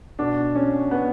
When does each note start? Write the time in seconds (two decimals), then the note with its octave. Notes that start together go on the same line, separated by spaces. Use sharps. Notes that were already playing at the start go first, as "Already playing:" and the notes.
0.19 B2 D4
0.56 C#4
0.91 B3